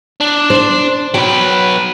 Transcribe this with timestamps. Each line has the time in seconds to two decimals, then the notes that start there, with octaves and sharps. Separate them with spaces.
0.21 D4
0.50 C5
1.14 F#3 B4 G5